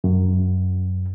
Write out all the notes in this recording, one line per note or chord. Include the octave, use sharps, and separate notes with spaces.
F#2